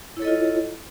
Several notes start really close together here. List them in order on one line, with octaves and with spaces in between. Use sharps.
E4 C#5 A4 D#5 F4